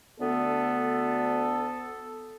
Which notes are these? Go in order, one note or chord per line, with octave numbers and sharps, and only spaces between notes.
D2 D3 B3 A4